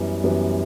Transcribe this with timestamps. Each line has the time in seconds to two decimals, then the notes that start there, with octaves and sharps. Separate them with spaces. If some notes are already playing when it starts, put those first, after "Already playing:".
Already playing: F#2 E3 G3 B3
0.24 F#2 E3 G3 B3